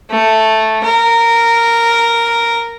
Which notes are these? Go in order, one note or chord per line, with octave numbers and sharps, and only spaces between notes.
A3
A#4